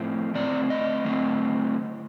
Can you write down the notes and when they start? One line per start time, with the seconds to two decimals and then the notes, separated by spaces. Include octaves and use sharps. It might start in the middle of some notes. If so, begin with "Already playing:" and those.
Already playing: A2 F3 C4
0.34 D3 A3 C4 D5
0.70 D#5
1.05 D3 A3 C4